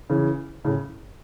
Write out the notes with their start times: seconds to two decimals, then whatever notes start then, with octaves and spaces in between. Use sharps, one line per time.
0.10 C#3 E3
0.65 A2 C#3